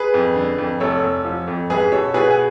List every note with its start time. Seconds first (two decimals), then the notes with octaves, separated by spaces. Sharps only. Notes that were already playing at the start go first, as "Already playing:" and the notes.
Already playing: G#4 B4
0.14 F2
0.36 D3
0.58 F2
0.80 F1 A4 C#5
1.03 F1
1.25 F3
1.47 F2
1.70 C#2 G#4 B4
1.92 B2 A4 C#5
2.14 B2 G#4 B4
2.31 G#4